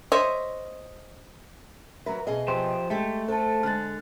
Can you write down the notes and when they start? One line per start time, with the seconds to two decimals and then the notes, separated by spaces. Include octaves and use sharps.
0.12 C5 C#5 D#5 E5
2.06 F#3 A#4 B4 E5
2.27 B2 G#4 D#5
2.48 F3 G4 C5
2.90 G#3 A3 G4
3.28 A4 C5 A5
3.63 D3 G#3 F6 F#6 A6